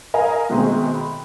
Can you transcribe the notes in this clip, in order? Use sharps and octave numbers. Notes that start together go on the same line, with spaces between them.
A#4 D#5 F5 G#5 A#5
B2 D#3 G#3 A3 C4
B5